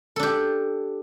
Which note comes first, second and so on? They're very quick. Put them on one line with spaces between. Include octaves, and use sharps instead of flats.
A4 D4 G4